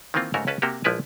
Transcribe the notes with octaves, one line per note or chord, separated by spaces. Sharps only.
D#3 E3 A#3 C4 F4
G#2 C#3 A3 F#4 A#4 C#5
C#2 C#4 B4 A5
C3 A#3 F#4 G4
A#1 F3 G#3 E4 B4 G#5